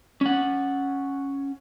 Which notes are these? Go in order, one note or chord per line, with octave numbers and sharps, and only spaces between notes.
C#4 F#5